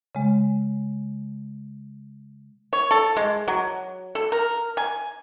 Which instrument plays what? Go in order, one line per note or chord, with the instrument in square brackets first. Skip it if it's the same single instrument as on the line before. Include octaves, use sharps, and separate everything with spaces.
[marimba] C#3 G#3
[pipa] C#5
A4
G#3
F#3
A4
A#4
G#5